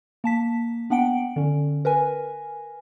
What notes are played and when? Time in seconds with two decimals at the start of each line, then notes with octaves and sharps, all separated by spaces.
0.24 A#3 A5 B6
0.90 B3 D4 F#5 G5 D7
1.36 D3 C#4
1.85 A#4 B4 G#5